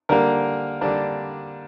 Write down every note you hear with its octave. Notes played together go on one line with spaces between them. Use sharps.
D3 G3 A#3 A#4
D3 G3 A#3 D4